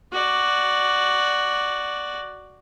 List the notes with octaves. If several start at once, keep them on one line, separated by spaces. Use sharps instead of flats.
F#4 D5